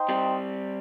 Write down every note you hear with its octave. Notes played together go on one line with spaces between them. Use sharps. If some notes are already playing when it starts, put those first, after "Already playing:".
Already playing: D#4 C5 D#5 G5
G3 C4